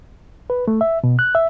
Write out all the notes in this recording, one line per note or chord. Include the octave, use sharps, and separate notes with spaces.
B4
A3
E5
B2
F#6
E5